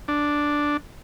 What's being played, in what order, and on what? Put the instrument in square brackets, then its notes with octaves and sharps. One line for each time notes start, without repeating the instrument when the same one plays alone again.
[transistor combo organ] D4